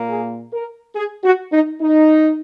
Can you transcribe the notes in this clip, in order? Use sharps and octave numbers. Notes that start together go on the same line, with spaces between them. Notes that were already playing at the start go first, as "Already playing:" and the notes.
Already playing: A#2 A#3
G#4
A#4
G#4
F#4
D#4
D#4